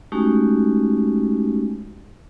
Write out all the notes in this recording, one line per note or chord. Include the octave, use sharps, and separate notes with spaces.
G#3 A3 C#4 D#4 F#4 G4